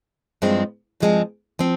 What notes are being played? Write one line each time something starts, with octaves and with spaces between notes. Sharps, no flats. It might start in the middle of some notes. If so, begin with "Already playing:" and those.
G2 F3 G#3 C4
G2 F3 G#3 C4
F3 C4